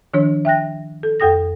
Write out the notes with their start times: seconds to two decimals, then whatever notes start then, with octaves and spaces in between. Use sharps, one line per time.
0.13 D#3 F3 D4 C#5
0.45 E5 G5 F#6 A#6
1.03 A4
1.20 F2 A4 G5 D#6 A#6